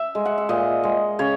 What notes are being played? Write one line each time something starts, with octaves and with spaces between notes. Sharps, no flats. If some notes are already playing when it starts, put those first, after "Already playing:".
Already playing: E5
G#3
F#5
E5
A#2 D#5
G#3
C#3 C#5